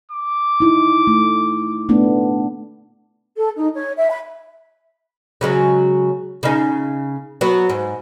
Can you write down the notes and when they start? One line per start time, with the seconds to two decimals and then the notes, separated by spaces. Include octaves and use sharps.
0.12 D6
0.60 D#4 E4
1.07 A3
1.89 A3 B3 D4
3.37 A4
3.57 D#4
3.74 C#5
3.96 E5
4.10 B5
5.41 C#3 F#3 G#3
6.43 C#3 D#4
7.41 F#3 B3
7.69 G#2